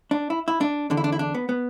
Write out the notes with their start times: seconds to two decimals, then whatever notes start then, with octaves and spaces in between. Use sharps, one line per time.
0.11 D4
0.30 E4
0.48 E4
0.61 D4
0.90 E2 D3 D4
0.97 E4
1.04 D4
1.12 E4
1.19 D4
1.34 B3
1.49 B3